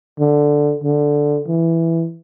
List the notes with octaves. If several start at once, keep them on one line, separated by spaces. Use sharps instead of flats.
D3
D3
E3